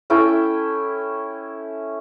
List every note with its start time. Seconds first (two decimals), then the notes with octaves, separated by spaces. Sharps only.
0.10 C#4 E4 A4 G5